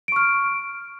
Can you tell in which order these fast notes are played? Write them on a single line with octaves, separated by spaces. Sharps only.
D7 C#6 F6